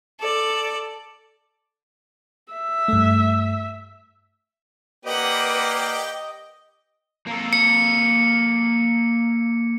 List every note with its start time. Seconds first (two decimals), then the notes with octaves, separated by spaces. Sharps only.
0.19 A4 D5
2.52 E5
2.88 G2 A3
5.05 A#3 G4 B4 D5 D#5 F#5 G5
7.27 A#3 A4
7.53 C#7